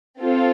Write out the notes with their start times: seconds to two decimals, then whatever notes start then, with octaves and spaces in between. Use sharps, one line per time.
0.21 C4 F4 A4